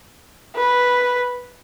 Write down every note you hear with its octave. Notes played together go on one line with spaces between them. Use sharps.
B4